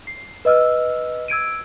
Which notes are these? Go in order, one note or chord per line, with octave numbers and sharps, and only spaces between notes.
C7
B4 D#5 E6 F6
E6 G#6 D7 D#7